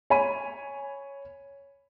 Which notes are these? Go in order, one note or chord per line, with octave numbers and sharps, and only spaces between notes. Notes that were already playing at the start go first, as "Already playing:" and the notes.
C#5 G#5 B5 D#7